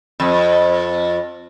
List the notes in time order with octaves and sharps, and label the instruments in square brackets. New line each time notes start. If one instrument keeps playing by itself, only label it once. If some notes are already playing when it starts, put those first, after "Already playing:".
[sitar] F2